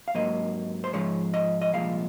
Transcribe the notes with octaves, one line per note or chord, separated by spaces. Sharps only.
F5
G#2 F#3 A#3 D#5
C5
G#2 F3 G#3 C#5
D#5
D#5
C2 A#2 F3 G#3 F5